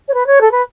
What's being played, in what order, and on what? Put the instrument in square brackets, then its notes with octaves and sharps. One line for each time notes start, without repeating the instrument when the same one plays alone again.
[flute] C#5
B4
C#5
A4
B4